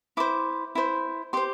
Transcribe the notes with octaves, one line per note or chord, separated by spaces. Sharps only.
E4 C5 D6
E4 C5
G4 C5 C6